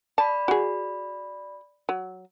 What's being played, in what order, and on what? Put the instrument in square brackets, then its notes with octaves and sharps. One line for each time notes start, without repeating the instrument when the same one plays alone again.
[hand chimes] D5 B5 [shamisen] A5
[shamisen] F#4 G#4
F#3